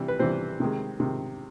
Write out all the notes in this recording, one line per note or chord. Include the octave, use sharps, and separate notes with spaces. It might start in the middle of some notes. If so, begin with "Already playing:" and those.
Already playing: C3 E3 G3
B4
C3 E3 G3 C4 C5
C3 D#3 G#3
C3 D#3 G#3